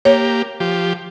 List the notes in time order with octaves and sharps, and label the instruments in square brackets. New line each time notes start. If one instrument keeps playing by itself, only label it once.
[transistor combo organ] A#3 G4 [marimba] C#5
[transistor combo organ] F3 G4